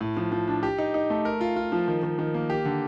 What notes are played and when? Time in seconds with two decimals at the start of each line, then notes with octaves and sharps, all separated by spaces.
0.01 A2
0.17 F3
0.32 F3
0.48 D4
0.63 G4
0.78 D#4
0.94 D#4
1.10 A3
1.25 A#4
1.41 F4
1.56 F4
1.72 F3
1.88 D#3
2.03 D#3
2.19 D#3
2.34 A#3
2.50 G4
2.65 D3